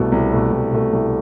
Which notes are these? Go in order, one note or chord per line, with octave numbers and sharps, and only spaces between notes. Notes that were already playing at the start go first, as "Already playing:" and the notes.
Already playing: C2 B2 A3
C2
B2 A3
C2
B2 A3
C2